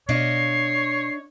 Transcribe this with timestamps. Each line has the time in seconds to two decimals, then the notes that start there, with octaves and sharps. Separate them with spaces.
0.09 B2 D4 C#5 D#5 F5 C7